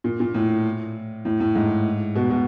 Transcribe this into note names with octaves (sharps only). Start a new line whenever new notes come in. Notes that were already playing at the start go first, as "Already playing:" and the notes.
A#2
A#2
A2
A2
A2
G#2
B2
B2